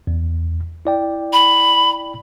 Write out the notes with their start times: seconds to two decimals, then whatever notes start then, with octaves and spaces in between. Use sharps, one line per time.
0.07 E2
0.85 E4 D5 G5
1.33 B5